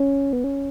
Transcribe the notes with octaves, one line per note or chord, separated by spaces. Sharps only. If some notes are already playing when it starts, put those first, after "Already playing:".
Already playing: C#4
B3
C#4